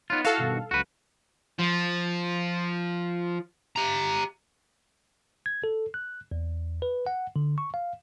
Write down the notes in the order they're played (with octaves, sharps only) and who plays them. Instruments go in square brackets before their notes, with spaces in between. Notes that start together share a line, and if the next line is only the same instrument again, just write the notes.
[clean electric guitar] B3 F4 [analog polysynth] D#4 C#5 F#6
[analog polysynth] E4 [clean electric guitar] F#4 [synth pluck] A4 F5
[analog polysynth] G2 B2 D#3
[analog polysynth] C#2 F#3 [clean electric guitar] F#4 B4
[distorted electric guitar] F3
G4 A#5
[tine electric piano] G#6
A4
F#6
E2
B4
F#5
D3
C#6
F5